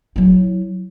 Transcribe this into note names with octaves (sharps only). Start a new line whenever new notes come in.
F#3 E4